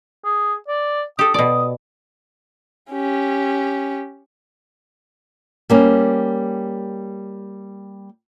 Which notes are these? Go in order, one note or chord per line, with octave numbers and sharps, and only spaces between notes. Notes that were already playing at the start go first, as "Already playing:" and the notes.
G#4
D5
G4 A4 D#6
B2 D5 D#6
C#4 G4
G3 A#3 C#4